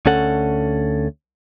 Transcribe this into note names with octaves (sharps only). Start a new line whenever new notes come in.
D2 C#4 A4 F#5